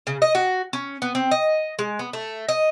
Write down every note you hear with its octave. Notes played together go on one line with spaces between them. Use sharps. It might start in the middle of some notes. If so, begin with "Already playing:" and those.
C#3
D#5
F#4
C#4
B3
C4
D#5
G#3
B3
A3
D#5